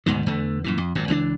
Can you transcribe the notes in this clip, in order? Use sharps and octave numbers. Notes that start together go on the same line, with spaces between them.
D2 G#2 B2 D#3
E2 D3 A3
F#2 A#2 E3
F2
G#1 F#2 A#2
C#2 E3 C4 D4